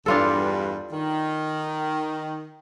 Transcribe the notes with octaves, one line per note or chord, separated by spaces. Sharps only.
E2 G2 D4 F4 A4
D#3